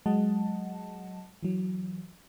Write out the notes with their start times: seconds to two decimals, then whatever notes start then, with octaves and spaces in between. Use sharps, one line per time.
0.06 F#3 G#3 D#5 F#5 A5
1.43 E3 F#3